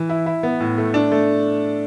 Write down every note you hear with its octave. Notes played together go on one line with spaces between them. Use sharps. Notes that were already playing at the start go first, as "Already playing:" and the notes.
Already playing: E3
E4
E4
B3
A2
A3
D4
A3